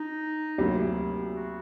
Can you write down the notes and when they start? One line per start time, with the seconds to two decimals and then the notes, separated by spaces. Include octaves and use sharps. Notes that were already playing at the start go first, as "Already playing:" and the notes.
Already playing: D#4
0.58 D2 C3 F#3 A#3
1.35 F#4